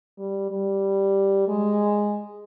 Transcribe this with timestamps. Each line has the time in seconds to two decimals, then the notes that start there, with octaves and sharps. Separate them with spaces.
0.18 G3
0.51 G3
1.48 G#3